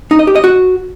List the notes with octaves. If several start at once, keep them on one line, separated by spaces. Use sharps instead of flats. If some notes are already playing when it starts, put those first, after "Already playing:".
D#4
D#5
G4
D#5
F#4